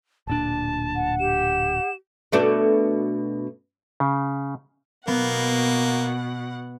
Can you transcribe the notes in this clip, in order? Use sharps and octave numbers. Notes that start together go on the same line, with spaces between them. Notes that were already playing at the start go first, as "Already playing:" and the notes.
D1 A#2 D4 A5
F#5
G4 E7
B2 A3 D4
C#3
B2 A#3 B3 F#5